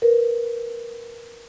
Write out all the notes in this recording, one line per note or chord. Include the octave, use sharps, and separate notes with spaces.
A#4 B4